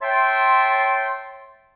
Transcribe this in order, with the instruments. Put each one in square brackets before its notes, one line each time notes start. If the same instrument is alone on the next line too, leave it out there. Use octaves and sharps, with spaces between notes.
[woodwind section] C#5 E5 G5 A5 C6